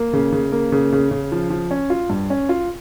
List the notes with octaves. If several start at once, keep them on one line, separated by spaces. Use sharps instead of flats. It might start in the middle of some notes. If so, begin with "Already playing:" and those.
Already playing: A#3
C#3
C#3
A#3
C#3
C#3
C#3
F3
F3
C#4
F4
G2
C#4
F4